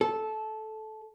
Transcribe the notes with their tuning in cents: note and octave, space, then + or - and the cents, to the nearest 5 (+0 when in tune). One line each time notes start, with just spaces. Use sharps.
A4 -15